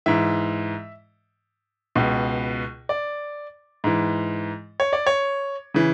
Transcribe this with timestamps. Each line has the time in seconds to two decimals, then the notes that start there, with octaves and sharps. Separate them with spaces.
0.06 G#2 E3 E5
1.95 C#2 B2
2.89 D5
3.84 G#2 E3
4.80 C#5
4.93 D5
5.07 C#5
5.74 C#3 E3